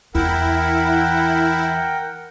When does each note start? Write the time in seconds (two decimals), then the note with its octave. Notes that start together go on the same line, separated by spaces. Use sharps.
0.15 E2 E3 E4 A#4 F#5 G5